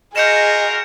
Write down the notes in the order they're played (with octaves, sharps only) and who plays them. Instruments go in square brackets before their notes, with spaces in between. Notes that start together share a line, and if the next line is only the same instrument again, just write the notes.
[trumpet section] F4 F#4 A#4 [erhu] G#4 [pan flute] D#5 [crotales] G6 C#7 E7